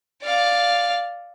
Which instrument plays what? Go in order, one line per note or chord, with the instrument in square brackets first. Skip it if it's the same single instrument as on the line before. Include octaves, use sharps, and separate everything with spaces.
[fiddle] D5 F5